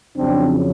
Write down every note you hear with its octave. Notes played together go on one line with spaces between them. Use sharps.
F2 C#3 F#3 C4 D4